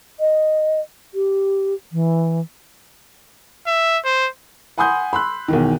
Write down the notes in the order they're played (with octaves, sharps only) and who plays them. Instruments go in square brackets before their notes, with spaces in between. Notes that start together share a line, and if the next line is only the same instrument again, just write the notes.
[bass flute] D#5
G4
E3
[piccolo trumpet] E5
C5
[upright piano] F#5 G#5 B5 C6 D#6 G6
B5 C6 E6 F#6
B1 E2 D#3